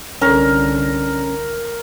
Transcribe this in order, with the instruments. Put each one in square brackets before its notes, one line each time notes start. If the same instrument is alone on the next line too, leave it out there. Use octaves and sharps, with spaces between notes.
[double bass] C2 D3 [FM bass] C#4 [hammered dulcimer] A#4